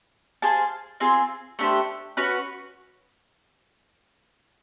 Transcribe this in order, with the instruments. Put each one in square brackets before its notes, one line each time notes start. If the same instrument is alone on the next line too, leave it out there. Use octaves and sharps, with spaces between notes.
[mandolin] G#4 C5 F5 A5
C4 F4 G#4
A3 D4 G4 C5
C#4 F#4 B4